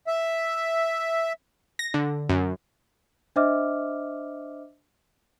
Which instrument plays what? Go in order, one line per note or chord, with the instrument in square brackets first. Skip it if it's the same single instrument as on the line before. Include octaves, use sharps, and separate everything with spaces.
[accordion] E5
[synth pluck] A#6
D3
F#2
[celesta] D4 C5 D#5 E5 D6 F6